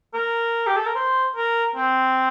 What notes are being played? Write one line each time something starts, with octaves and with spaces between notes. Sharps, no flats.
A#4
G4
A4
A#4
C5
A#4
C4